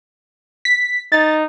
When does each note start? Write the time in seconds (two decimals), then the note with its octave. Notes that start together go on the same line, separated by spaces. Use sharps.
0.65 B6
1.12 D#4 A6